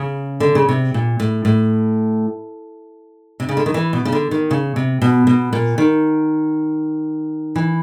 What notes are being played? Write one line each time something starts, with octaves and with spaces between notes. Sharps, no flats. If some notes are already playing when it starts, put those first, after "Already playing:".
Already playing: C#3
D3
C#3
C3
A#2
A2
A2
C3
C#3
D3
D#3
E3
B2
C#3
D3
D#3
C#3
C3
B2
B2
A#2
D#3
E3